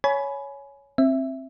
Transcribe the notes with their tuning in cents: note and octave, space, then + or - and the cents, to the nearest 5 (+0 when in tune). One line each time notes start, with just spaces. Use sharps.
C#5 +5 G#5 +20 B5 +0
C4 +20 E5 +0